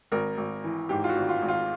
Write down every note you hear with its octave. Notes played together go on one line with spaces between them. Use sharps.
G#1 A#4
G#1
E3
G#2 G4
F4
F#4
G#1
F4
G#1
F4